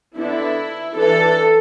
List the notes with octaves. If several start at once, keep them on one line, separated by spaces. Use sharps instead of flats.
D3 B3 D4 E4
E3 D4 A4